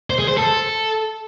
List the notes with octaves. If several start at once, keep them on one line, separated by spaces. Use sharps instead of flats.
C5
G#4
C5
A4